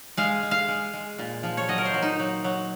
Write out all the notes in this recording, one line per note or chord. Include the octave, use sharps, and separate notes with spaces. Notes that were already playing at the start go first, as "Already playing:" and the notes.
G#3 F5
G#3
F5
G#3
G#3
A#2
F3
C#5
F#3 D#5
A#4
C5
F#3
D#4
F#3
F#3